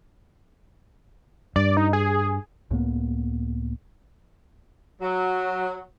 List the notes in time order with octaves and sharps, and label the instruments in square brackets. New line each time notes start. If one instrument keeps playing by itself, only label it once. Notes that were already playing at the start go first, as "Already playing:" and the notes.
[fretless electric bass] G2 [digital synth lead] D5
[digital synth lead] D#4
G#4
[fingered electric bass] C#2 A2 A#3 B3
[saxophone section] F#3